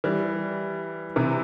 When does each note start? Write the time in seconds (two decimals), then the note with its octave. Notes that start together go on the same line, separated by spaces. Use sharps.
0.04 E3 G3
1.16 C3 E3